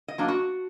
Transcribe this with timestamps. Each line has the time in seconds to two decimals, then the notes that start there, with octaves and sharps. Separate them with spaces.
0.08 D#5
0.18 F#3 A#3 D4
0.28 F#4